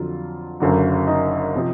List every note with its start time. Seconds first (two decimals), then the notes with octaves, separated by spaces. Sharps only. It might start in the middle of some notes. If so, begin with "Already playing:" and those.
Already playing: F2 D3 F#3 F4
0.60 F#1 F#2 D3 F#3
1.07 D#4
1.56 C3 F3